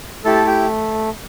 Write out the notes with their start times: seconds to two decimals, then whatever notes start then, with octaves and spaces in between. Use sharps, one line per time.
0.25 A3 E4 G4 A4 A5
0.47 G4 G5